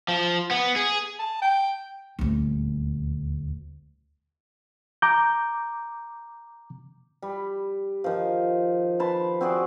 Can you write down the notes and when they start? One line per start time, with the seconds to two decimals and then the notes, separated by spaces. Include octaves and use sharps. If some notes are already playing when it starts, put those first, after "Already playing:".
0.08 F3
0.51 B3
0.76 G#4
1.20 A5
1.42 G5
2.19 D#1 D2
5.02 A#5 D6 G6
7.22 G3
8.04 D#3 F3
8.99 B4 A5 C6
9.41 C4 F#4 G#4 D5